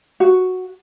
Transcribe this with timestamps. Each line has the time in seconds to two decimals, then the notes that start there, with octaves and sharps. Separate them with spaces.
0.20 F#4